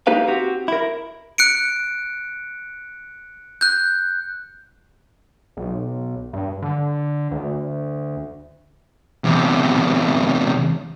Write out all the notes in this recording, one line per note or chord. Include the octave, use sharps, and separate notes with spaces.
A#3 D#4 G4 B4 F5
C4 F#4 G4
E4 A#4
F#6 C#7 D7
F#6 G6
B1
G2
D3
D2
E2 C3